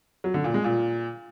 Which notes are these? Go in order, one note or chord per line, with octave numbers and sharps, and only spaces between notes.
F#3
D3
A#2
G#3
A#2